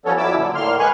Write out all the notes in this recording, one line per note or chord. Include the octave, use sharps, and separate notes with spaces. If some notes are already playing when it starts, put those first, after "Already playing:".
F3 G3 B3 C#4 A4 C#5
F2 F#3 E4 D6 E6
A#2 D3
A2 A#3 C6 F6
G#3 B4 G#5 C#6 F#6